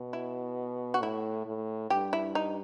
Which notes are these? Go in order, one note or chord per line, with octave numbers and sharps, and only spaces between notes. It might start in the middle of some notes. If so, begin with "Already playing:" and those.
Already playing: B2
E4
F#4
A2 E4
A2
G2 G4
E4
D#4